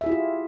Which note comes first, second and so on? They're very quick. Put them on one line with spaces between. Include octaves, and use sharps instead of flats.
E5 G#4 E4 G4 F4